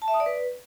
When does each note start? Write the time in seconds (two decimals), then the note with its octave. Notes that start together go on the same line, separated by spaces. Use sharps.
0.02 A5
0.08 E5
0.14 D#6
0.20 D5
0.26 B4